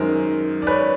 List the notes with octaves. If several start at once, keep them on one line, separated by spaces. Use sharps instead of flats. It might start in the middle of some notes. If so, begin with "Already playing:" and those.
Already playing: F#2 D#3 G#3 A#4 C5
D5
B4 C#5